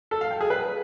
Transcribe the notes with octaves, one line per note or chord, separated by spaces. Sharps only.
A4
F5
G5
G#4
B4